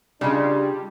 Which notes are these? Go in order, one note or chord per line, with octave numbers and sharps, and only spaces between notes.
C#3 G3 D4 D#4 F4